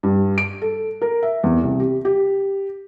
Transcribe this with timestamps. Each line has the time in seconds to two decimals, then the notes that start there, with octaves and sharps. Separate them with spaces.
0.03 G2
0.38 D7
0.62 A4
1.02 A#4
1.23 E5
1.43 E2
1.63 C2
1.80 G4
2.05 G4